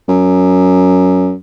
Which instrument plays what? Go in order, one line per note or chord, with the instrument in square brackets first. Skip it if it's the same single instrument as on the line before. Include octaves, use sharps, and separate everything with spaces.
[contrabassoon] F#2